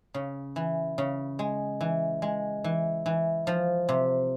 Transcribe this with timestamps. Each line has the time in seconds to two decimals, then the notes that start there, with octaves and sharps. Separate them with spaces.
0.14 C#3
0.56 E3
0.98 C#3
1.39 G#3
1.81 E3
2.22 G#3
2.64 E3
3.06 E3
3.47 F3
3.89 C3